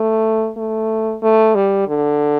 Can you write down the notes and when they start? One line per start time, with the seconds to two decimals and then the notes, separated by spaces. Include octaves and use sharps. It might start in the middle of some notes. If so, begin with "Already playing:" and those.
Already playing: A3
0.57 A3
1.22 A3
1.55 G3
1.88 D3